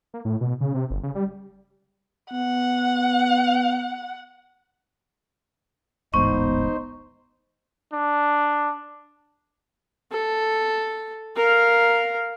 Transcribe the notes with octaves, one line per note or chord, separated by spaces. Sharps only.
A#3
A2
B2
C#3
C3
G1
C#3
G3
B3 F#5
D1 A1 G#2 B3 D#4 C5 C#6
D4
A4
A#4 F5